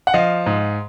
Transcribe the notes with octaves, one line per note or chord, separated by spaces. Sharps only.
F#5
F3 D#5 F5
G#2